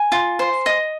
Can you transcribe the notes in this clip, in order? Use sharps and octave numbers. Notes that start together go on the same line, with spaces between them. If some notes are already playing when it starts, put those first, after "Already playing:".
Already playing: G#5
F4
C5
D#5